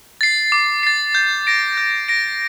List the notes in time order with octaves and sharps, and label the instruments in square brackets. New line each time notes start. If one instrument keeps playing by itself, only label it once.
[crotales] A6 C7
D6
A6 C7
G6
A#6 D7
G6
A#6 D7